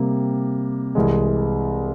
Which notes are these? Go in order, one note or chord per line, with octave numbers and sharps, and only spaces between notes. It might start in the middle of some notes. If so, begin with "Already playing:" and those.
Already playing: C3 G3 A#3
C2 C3 E3 G#3